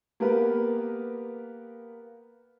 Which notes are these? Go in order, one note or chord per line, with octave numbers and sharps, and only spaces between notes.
A#3 B3 G4 A#4 B4